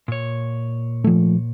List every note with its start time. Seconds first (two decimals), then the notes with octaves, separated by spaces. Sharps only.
0.08 A#2 C#5
1.04 F3 A3